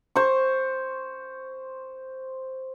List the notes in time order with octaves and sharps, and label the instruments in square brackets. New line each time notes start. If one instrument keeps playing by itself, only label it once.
[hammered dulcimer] C5 C#6